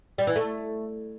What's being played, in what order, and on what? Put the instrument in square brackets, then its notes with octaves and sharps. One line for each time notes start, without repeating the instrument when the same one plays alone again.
[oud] G3
E3
A3